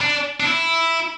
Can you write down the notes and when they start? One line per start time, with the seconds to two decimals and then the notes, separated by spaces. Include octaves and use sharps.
0.01 D4
0.40 D4
0.45 E4